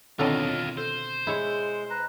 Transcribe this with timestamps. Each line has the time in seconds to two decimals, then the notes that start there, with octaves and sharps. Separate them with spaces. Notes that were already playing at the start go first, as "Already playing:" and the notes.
0.19 B2 D3 D#3 C4 F4 A4 C#5 D#5
0.77 A4 C5
1.27 G#3 E4 C#5
1.90 B4 A#5